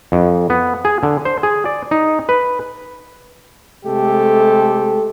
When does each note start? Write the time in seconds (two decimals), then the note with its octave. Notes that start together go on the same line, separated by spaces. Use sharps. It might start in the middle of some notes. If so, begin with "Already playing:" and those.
0.12 F2
0.50 B3
0.85 G#4
1.03 D3
1.25 C5
1.43 G#4
1.65 D5
1.91 D#4
2.29 B4
3.85 C3 G#3 A3 G4 A4